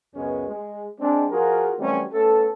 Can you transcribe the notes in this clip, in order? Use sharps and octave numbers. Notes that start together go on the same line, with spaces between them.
C#2 F#2 G#3 B3 C#4
G#3
G#3 C4 D4
F3 F4 F#4 G#4 A#4
E3 F#3 G3 A3 C4 C#4
A3 B3 C#4 A4